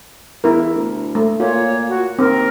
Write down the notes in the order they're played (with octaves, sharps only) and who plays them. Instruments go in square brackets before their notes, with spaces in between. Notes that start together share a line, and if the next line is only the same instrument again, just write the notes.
[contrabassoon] E2 [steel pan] E4 A#4
[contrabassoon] D2
[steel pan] A3
[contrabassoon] A#2 [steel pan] F4 [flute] C#5
[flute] F#4
[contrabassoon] D#2 [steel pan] C4 [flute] A#4